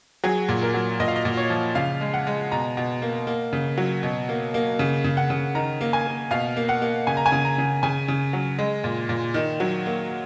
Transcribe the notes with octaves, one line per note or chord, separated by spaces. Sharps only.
F#3 G#4
A#2
A#4
F#3
A#2 D#5
F5
D#5
A#2
C#5
F3
C#3 F5
G#3
F#5
G#3
B2 A#5
B2
A#3
A#3
C#3
F#3
B2
A#3
A#3
C#3
C#3
F#5
C#3
D#3 A#5
A#3
G#5
A#3
B2 F5
A#3
F#5
A#3
C#3 G#5
A#5
G#5
C#3
A#5
C#3
C#3 G#5
C#3
F#3
G#3
A#2
A#2
D#3
F#3
A#3